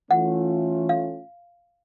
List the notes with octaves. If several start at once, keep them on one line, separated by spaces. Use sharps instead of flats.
E3 A3 C#4 F4 F#5
F5